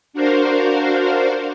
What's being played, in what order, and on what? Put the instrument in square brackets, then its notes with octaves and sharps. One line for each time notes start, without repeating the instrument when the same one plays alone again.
[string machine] D4 F#4 A#4 C5 F5